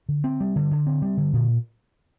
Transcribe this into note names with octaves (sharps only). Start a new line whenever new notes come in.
D3
C4
G3
D3
D3
C4
G3
D3
A#2